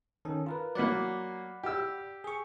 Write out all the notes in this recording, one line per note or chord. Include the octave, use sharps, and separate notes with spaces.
D#3 C#4 A4
F4 A#4 B4
F#3 A#3 D5 F#5 B5
G4 E6
G#4 C#6